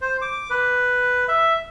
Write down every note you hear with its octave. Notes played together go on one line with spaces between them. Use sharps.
C5
D6
B4
E5